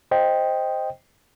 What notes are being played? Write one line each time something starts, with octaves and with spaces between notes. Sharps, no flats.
C5 D#5 G5